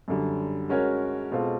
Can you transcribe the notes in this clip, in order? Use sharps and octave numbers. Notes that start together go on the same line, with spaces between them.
F#2 D3 G3
G#3 C#4 F#4 A#4 C#5
B2 G#3 C4 F4 A4